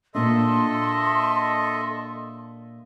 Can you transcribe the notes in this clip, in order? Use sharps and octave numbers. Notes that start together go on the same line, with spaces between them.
A#2 D4 A4 D#5 E5 C6